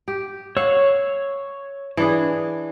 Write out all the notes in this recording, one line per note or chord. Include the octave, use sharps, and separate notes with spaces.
G4
C#5 F5 F#5 E6
E3 D4 G#4